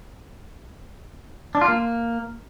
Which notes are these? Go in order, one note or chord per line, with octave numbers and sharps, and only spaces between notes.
D4
F4
A#3